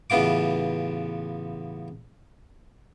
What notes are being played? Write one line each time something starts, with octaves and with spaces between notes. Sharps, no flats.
A1 C#3 B3 F4 D6